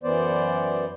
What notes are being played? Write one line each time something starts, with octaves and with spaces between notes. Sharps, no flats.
F#2 E3 B3 C5 D5